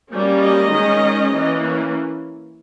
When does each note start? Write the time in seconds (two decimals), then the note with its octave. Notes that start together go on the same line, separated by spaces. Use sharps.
0.12 G3 A#3 C#4
0.42 D#5
0.72 D#3 G#3 C#4
1.32 E3 A#3 C#4